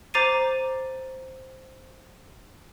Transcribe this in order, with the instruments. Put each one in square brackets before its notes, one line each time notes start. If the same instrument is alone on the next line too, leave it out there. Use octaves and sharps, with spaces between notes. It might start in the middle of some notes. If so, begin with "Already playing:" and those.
[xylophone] C5 A#5 D6 A6 C7 D#7